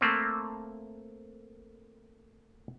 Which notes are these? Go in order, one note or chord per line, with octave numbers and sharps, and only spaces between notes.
A3 A#3 C4